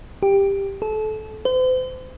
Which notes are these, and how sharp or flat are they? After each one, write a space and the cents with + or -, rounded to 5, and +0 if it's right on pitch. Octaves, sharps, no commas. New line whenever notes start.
G4 +10
A4 -30
C5 -40